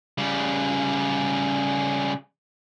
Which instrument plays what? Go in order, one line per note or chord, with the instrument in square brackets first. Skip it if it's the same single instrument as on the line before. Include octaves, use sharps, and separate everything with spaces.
[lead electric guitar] C#3 G3